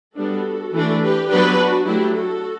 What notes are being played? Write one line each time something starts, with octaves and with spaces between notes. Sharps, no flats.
G3 B3 D4 F#4 A4
E3 A3 D4
G4 B4
F#3 B3 D4 G4 B4
D4 F#4
F#3 A3 D4 E4 G4
F#4 A4